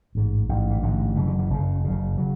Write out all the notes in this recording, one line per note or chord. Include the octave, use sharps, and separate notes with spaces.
A1 G#2
A1 G#2
E3
A1 G#2 D3
F#1 F#2 C#3 E3
D3
E3
F#1 F#2 C#3
F#1 F#2 C#3
C#3 F#3